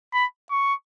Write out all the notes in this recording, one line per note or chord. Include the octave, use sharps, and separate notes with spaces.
B5
C#6